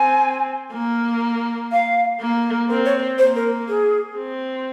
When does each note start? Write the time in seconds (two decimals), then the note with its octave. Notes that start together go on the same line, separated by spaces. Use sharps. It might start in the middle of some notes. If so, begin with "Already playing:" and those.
Already playing: C4 G#5
0.73 A#3
1.72 F5
2.21 A#3
2.70 C4 A#4
2.86 C#5
3.18 A#3 C5
3.36 A#4
3.69 G#4
4.17 C4